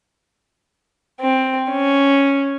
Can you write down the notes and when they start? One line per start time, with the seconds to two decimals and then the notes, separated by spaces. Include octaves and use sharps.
1.19 C4
1.69 C#4